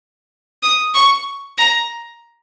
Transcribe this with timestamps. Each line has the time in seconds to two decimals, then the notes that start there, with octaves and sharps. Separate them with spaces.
0.63 D#6
0.94 C#6
1.58 A#5